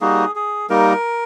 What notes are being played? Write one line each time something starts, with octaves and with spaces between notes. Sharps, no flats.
G3 A#3 D#4 F#4 G#4
G#4
G3 A#3 D#4 A#4